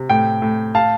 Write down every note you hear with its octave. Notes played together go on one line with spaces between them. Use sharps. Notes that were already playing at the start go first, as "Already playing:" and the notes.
Already playing: C3
A2 G5
A2
F5 A5